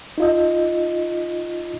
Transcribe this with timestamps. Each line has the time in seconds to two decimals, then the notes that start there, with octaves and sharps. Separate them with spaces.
0.18 D#4 F4 D#5